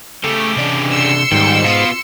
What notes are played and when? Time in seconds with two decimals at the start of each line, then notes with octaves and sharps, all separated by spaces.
0.24 C#3 A3 G4
0.56 C3 D4
0.92 C6 E6 C#7
1.32 G#2 D#3 G3 G5
1.65 B2 B3 F4